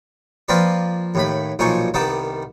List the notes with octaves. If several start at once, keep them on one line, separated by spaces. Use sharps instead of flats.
F3 A#3 C4 F4 B4 D5
D#2 A2 B5
B1 A#2 F3 D#4 G#5 C#6
C2 D#3 B3 D#4 A5 D6